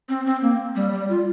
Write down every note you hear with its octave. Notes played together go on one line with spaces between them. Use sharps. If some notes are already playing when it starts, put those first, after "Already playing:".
C4
C4
A#3
G3
G3
F4